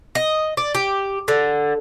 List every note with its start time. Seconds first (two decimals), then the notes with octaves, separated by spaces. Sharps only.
0.15 D#5
0.57 D5
0.75 G4
1.28 D3